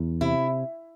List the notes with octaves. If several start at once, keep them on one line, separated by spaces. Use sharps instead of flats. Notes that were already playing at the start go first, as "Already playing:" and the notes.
Already playing: E2
C3 E4